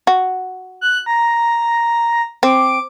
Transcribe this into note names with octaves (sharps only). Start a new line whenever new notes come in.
F#4
F#6
A#5
C4 D6